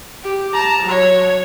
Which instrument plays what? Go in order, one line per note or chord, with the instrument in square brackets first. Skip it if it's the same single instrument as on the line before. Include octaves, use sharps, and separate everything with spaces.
[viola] G4
A5 A#5
F#3 C#5